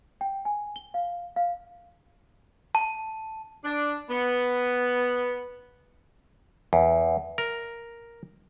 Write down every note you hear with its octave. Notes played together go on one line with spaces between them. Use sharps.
G5
G#5
G7
F5
F5
A5
D4
B3
E2
A#4